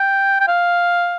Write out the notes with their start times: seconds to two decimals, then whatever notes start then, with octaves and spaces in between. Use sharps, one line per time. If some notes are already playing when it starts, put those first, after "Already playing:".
Already playing: G5
0.40 G5
0.48 F5